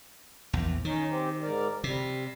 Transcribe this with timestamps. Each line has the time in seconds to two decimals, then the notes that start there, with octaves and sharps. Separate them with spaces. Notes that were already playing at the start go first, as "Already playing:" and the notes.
0.53 A#1 E2
0.85 D#3 C#4 D#4
1.10 C4 G4
1.42 G#2 A#4 D5
1.84 C3 G3